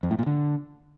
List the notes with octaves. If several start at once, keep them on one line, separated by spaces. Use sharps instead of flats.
F2
A2
A#2
D3